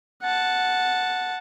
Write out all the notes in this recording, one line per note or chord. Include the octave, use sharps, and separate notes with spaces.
F#5 A5